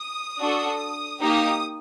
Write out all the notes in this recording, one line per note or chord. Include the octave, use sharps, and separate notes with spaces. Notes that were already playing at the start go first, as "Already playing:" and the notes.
Already playing: D#6
D4 F#4 A4
A#3 D#4 G4 D#6